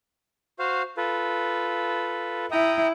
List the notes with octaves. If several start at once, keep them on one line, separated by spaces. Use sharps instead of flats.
F#4 C5 F5
F4 A4 B4
E4 G5 A#5 D#6